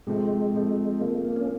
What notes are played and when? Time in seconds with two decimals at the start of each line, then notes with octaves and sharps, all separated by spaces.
0.07 C3 F3 G#3 A3 C4
0.54 C3 F3 A3 C4
1.01 C3 F3 A3 A#3 C4
1.25 A#3
1.36 C#4